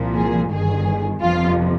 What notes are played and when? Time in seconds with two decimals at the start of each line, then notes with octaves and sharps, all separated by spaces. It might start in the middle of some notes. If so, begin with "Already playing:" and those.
Already playing: C2 A#2 F3
0.15 G#4
0.50 G1 G2 D#3 G#4
1.21 G1 F2 C3 F3 F4